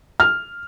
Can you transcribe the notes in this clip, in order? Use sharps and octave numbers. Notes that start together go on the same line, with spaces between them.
F6